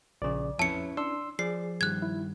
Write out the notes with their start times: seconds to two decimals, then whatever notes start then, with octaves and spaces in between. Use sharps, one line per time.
0.22 A#1 C#3 D5
0.59 F2 C#4 E4 B4 C#5 E5 A5 C#7
0.97 D4 C6 E6
1.39 F3 G#4 D5 C7
1.81 G2 D#3 G3 F#6 G#6
2.02 E4